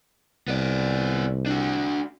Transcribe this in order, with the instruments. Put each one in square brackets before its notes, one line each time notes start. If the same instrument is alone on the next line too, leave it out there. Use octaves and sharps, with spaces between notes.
[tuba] C2 [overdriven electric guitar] B3 D5
[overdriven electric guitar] D4 F#4